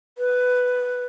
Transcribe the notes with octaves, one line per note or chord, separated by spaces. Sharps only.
B4